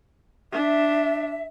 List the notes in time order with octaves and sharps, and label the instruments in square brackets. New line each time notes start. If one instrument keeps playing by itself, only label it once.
[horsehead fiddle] D4 [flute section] E5